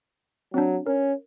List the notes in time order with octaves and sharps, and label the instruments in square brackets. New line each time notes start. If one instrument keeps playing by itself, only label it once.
[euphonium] F#3 [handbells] C4 D4
[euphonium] C#4 [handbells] A#4